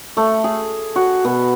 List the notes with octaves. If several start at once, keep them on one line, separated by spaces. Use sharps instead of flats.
A3
G#4
F#4
B2